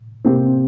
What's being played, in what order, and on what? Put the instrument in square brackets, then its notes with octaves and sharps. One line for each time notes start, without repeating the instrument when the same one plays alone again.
[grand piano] C3 A#3 G4 [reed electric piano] C4